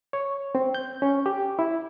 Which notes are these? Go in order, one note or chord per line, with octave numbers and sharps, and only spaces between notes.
C#5
C4
G6
C#4
G4
E4